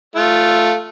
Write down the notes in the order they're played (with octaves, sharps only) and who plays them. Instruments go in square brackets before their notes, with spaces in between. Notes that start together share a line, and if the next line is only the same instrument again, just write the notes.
[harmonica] A3 F4